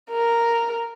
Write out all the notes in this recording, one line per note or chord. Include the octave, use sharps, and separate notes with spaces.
A#4